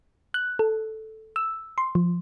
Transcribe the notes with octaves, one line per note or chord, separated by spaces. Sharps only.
F#6
A4
E6
C6
F3